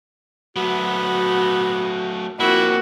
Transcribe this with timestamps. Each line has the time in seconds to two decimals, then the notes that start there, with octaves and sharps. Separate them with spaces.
0.56 F#3 A3 B3 F#4
2.40 F3 A#3 C4 E4 F#4